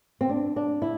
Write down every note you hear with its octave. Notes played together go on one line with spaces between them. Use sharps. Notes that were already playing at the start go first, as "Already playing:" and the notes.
C4
D4
D4
E4